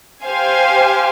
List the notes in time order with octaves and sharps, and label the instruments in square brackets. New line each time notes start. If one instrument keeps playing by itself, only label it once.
[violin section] G4 C5 F5 G#5